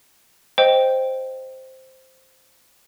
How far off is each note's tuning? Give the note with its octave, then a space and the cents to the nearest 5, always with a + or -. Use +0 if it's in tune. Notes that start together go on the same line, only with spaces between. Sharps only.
C5 +0 D#5 +0 G5 +0